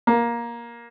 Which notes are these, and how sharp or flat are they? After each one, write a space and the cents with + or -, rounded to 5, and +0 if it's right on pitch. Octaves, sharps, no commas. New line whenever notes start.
A#3 +15